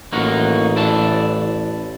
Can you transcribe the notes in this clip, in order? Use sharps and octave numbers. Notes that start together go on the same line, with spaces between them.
A1 A#3 D#4 F#4
E4 D5 A5